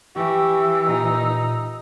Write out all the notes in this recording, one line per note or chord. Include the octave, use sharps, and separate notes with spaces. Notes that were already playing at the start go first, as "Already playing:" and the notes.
E3 G4 C#6 E6
A#2 D#4